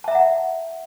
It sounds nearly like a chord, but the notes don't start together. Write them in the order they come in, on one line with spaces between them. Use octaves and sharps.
A5 E5 A#5 F#5